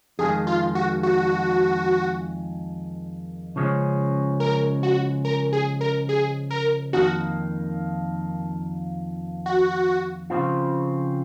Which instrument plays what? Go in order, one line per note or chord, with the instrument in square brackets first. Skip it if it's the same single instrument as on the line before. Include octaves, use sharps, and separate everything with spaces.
[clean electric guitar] F2 D#3 G#3 [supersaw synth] G#4
[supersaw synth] F4
F#4
F#4
[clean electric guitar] C#3 F3 G#3 C#4
[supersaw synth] A#4
F#4
A#4
G#4
A#4
G#4
A#4
[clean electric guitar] F2 D#3 A#3 [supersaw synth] F#4
[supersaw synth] F#4
[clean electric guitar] C#3 F3 C4 F4